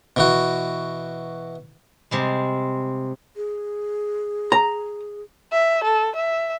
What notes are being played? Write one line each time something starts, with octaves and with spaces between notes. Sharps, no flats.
B2 E3 F#4
C3 G3 G#3
G#4
A#5
E5
A4
E5